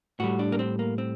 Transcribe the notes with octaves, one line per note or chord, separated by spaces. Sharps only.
A2 G3 F#4
D4
A#3
C4
A#3
C4